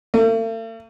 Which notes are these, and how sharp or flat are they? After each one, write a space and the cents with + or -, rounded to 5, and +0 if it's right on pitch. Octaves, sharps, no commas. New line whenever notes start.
A3 +45